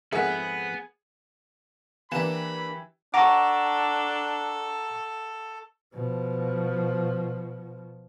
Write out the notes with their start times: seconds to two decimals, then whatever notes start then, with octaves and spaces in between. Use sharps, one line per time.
0.12 F2 G#2 B3 G#4 E5 F#5
2.12 E3 A#3 D4 G4 B5 E7
3.14 D4 A4 F#5 A#5 C#6 D6
5.93 B2 F3